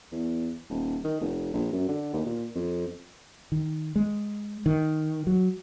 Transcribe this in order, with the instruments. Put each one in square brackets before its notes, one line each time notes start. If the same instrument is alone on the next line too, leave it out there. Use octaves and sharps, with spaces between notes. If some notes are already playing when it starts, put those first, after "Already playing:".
[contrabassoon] E2
D#1
D#3
F1
A#1
F#2
D3
D#2
A#2
F2
[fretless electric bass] D#3
G#3
D#3
F#3